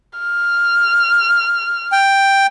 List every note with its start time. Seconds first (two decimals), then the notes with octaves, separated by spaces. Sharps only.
0.19 F6
1.92 G5